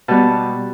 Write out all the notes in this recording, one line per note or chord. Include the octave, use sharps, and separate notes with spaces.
B2 G3 B3 A5